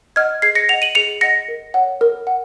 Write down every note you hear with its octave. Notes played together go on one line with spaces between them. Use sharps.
D#5 F#5 F6 G#6
G#4 G#6 C7
A#6 C#7
D#5 F#5 C#7 F7
D#7 F#7
G#4 C#7 F7
D#5 F#5 A#6 C#7
A#4
C#5 F#5
A#4
F#5